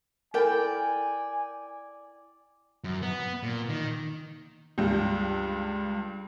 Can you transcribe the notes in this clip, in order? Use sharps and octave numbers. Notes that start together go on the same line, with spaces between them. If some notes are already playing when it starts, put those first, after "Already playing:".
E4 A4 A#4 D5 G5 G#5
F#2
B3
A#2
D#3
C#2 G2